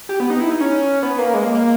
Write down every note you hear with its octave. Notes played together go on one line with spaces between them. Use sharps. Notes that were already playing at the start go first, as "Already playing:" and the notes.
G4
B3
D#4
E4
D#4
C#4
B3
A#3
G#3
A#3
A#3